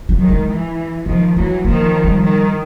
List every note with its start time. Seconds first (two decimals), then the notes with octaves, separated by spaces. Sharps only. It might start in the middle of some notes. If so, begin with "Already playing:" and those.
0.09 F#3
0.19 D#3
0.29 G#3
0.49 E3
1.06 D#3 F3 G#3
1.36 E3 F#3 A3
1.65 D#3 F3 A#3
2.04 G3
2.24 D#3